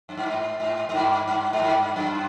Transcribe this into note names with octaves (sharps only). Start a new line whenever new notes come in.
F#2
G2
G#2
G#2
G#2
G2
G2
G#2
G2
F#2